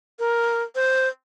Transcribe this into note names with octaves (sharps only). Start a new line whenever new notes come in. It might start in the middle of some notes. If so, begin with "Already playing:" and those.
A#4
C5